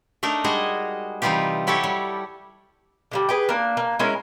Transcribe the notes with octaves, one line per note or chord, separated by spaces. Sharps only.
A3 D4 D#4 A#4
G3 G#3 F#4 G#4 D#5
C3 E3 G3 D#4 F4 G4
F#3 E4 G4 A4 C#5
G3
D3 F#3 G3
G#4 B4 G5
A#3 D4
A#3
G#3 C#4 E4 A#4